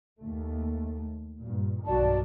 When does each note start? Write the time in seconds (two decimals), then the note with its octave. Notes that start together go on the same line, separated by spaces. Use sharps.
0.20 D#2 A3
1.40 G2 A#2
1.86 B1 G2 D#3 F#4 D5 A5